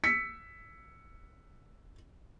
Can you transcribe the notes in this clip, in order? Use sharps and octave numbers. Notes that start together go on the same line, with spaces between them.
E6 B6 C#7